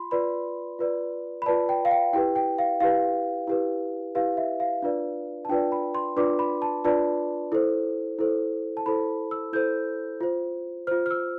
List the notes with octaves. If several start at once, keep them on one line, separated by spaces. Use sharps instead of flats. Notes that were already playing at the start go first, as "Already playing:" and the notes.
Already playing: F4 B5 C6
F4 B4 D5 B5
F4 B4 D5
B5
F4 B4 D5 A5
G5
F5
G5
E4 G4 B4 G5
G5
F5
E4 G4 B4 F5
E4 G4 B4
E4 G4 B4 F5
E5
F5
D4 F4 B4 D5
A5
D4 F4 B4 D5 G5
B5
C6
D4 F4 B4 D5 D6
B5
A5
D4 F4 B4 D5 A5
E4 A4 C5
E4 A4 C5
A5
E4 A4 C5 B5
E6
E4 A4 C5 G6
F4 C5
F4 C5 F6
F6
E6